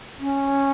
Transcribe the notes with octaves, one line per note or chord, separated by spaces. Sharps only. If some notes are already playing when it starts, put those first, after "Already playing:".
C#4